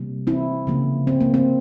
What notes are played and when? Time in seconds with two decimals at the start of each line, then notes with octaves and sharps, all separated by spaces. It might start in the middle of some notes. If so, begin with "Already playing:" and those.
Already playing: C3 G3 A#3
0.27 C4 E4
0.67 C#3 F3 A#3
1.07 C4
1.20 A#3
1.34 C4